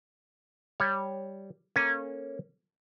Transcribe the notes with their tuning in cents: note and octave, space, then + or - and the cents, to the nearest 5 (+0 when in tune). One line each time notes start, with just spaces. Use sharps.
G3 +0 C#5 +0
A#3 +0 C#4 -15 A4 +0